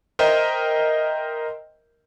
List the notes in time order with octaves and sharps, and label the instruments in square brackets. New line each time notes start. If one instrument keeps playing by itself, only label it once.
[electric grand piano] A#4 C5 D#5 E5 G5